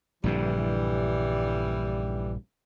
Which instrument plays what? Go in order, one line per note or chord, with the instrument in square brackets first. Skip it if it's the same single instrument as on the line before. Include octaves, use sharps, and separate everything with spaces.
[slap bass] A#1 G2 D3 [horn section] E3 G3